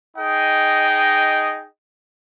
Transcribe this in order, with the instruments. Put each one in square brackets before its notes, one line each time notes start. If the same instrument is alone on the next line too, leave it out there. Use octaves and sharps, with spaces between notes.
[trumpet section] D#4 G#4 D#5 G5